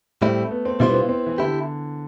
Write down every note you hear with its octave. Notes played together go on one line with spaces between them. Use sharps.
A2 G3 A3 C4 E4
B3
C4
B2 G3 D4 E4 F4 C5
B3
C4
C4
E3
D3 E4 G4